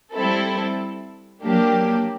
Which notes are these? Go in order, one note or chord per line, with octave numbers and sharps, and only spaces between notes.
G3 C4 E4 A4
F#3 A#3 D4 G4